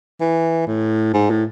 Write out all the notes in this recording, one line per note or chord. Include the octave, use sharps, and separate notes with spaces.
E3
A2
G#2
A2